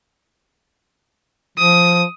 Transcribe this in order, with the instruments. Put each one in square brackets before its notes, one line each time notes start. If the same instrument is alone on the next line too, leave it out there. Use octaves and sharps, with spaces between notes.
[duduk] F3 [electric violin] D#6